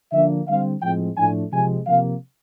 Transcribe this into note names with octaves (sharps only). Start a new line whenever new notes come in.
D3 F3 A#3 D4 E5
D3 G3 C4 F5
A2 F3 G#3 C4 G5
A2 F3 A3 D4 G#5
C3 F3 G#3 C4 G#5
C3 F3 A#3 F5